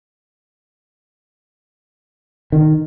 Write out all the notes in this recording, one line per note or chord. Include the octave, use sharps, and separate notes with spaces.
D#3